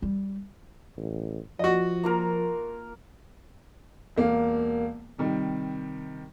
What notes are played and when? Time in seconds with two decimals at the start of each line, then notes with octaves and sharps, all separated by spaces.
0.02 G3
0.97 A1
1.59 F3 F#4 D#5
2.03 A#3 F4 A#4
4.17 E1 A#3 F5
5.18 C3 D#3 G3